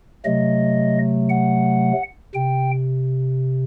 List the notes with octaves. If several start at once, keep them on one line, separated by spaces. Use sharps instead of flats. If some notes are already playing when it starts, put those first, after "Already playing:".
C3 F#3 A3 D#5
F#5
C3 G5